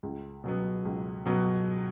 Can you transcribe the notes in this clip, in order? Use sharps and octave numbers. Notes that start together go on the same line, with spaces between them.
C#2
B2 F#3 B3
C#2
B2 F#3 B3